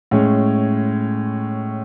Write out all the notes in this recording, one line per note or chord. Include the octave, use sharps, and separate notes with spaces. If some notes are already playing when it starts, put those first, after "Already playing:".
A2 G#3 C#4